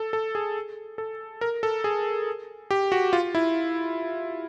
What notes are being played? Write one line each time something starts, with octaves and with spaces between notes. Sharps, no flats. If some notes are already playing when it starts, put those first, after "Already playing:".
Already playing: A4
A4
G#4
A4
A#4
A4
G#4
G4
F#4
F4
E4